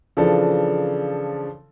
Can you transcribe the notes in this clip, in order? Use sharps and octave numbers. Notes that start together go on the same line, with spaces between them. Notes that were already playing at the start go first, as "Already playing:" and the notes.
C#3 E3 F3 D4 A4